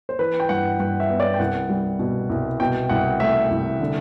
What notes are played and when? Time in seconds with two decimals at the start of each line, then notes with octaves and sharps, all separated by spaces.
0.09 C5
0.19 E3 B4
0.40 G5
0.49 G2 F#5
0.79 G2 F#5
1.00 E5
1.10 B3
1.20 D5
1.34 G5
1.39 C2 F#5
1.69 G3
1.99 B2
2.29 C2
2.60 B2 G5
2.90 C2 F#5
3.20 A3 E5
3.51 C2
3.80 D3